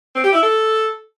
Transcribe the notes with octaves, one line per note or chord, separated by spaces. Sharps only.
C4
G4
E4
A4